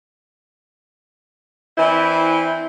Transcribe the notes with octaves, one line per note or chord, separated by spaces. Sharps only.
E3 C4 D4 E4 C5